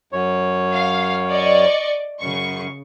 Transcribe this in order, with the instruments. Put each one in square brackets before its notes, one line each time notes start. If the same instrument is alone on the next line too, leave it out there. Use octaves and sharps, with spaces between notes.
[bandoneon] F#2 C#5
[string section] F5
D5 D#5 C#6
[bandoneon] F#2 [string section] C#3 C#6